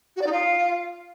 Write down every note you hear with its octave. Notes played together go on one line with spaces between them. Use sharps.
F#4
D5
D#4
F4